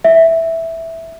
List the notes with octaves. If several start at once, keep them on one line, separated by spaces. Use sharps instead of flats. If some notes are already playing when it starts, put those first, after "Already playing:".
E5